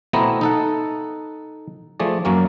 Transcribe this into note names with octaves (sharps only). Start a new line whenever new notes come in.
B2 A3 B3 C4 E4 A#5
D#4 A4 F#5
F3 A3 G#4 D5
F#2 F#3 A#3 C#4